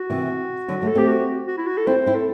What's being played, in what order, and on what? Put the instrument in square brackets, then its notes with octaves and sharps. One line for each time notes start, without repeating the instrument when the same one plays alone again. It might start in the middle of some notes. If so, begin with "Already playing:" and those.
Already playing: [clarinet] F#4
[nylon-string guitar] C3 E3
D3 F#3
F#3 A3
[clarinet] A4
[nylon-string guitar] A3 C4 [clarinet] G4
[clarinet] F#4
F#4
E4
F#4
A4
[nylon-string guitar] C4 E4 [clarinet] C5
[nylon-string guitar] C4 E4
[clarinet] A4